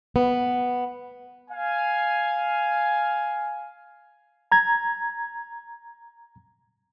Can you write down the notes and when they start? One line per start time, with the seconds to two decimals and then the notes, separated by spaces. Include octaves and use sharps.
0.16 B3
1.50 F5 G#5
4.52 A#5 G#6